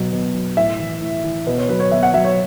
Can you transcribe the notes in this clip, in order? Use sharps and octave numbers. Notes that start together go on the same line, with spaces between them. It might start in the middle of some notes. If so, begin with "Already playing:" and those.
Already playing: B2 F#3
B2
F#3
A2 E5
E3
A2
E3
B2 B4
C#5
F#3 B4
C#5
B2 E5
F#5
F#3 E5
C#5